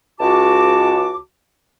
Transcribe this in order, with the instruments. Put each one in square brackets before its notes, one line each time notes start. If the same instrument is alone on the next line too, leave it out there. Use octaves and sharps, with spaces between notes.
[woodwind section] C#2 F#4 A5 D6